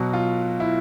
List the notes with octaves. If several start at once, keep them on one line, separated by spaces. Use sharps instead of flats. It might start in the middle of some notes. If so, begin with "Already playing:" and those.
Already playing: B2 F#3 F#4
F4
E4